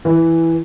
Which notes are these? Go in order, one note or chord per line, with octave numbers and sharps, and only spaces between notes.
E3